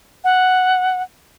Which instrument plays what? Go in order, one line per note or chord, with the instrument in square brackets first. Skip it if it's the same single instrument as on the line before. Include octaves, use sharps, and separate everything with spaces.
[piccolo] F#5